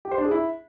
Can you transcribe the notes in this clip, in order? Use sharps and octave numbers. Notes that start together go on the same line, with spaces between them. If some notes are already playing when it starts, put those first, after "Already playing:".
G4
C5
D4
G#4
E4